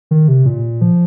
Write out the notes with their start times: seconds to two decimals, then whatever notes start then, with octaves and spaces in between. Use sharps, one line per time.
0.11 D#3
0.28 C3
0.45 A#2
0.81 F3